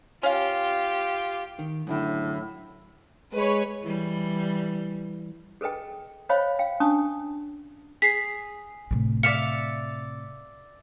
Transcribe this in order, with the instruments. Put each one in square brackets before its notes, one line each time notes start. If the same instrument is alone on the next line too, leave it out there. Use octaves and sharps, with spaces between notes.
[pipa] C#4 F5 [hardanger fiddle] F4 G4
[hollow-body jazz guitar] D#3
[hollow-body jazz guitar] F#2 D3 E4 [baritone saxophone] A2
[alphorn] G#3 [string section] B4 C#5
[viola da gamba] E3 G3
[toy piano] G#4 A4 B4 D#5 G5
C5 C#5 D#5 F5 G5 B5
F5 G5
C#4 D4 A5 C#6 D#6
[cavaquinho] G#4 [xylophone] B6 C7
[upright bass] A2 C3
[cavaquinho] D5 E5 F5 [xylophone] C#7